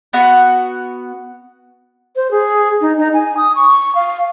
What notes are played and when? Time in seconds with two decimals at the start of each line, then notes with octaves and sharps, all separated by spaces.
0.13 B3 F#4 F#5
2.16 C5
2.31 G#4
2.81 D#4
2.98 D#4
3.14 G#5
3.37 D#6
3.56 C#6
3.95 F5